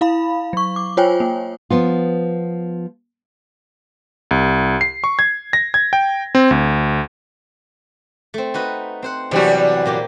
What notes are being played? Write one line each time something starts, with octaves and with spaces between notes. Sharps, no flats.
E4 F5 B5
F#3 C#6
D6
F4 C5 C#5 G5 G#5
A#3
F3 B3 F4
C2
C7
C#6
G#6
A#6
G#6
G5
C4
D2
A3 C4
D#4 F#4 B4
C4 C5 F#5
E2 C3 F#3 G3 F#4
A#2 A#3 G4